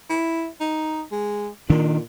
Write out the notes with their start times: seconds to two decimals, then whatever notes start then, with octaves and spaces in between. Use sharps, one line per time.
0.10 E4
0.61 D#4
1.12 G#3
1.70 A#2 D#3 D4